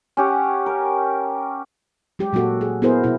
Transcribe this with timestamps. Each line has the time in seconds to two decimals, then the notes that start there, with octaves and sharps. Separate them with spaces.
0.17 C#4 G4 F#5
0.66 A#4
2.19 F#3 G#3 G4
2.33 A#2 F#3 A#3 F#4 A4
2.61 G#4
2.82 B3 E4 G#4 A#4 C5
3.04 B2 E4